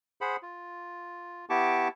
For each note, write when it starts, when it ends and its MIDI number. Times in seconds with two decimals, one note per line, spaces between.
0.21 0.36 68
0.21 0.36 72
0.21 0.36 78
0.21 0.36 83
0.42 1.45 65
1.50 1.88 59
1.50 1.88 64
1.50 1.88 67
1.50 1.88 81
1.50 1.88 85
1.50 1.88 86